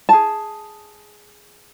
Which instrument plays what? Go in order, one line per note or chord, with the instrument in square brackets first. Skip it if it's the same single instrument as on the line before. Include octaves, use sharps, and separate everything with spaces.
[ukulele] G#4 A5